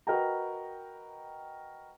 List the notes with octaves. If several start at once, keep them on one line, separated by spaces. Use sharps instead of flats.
F#4 A#4 B4 D#5 G5 A#5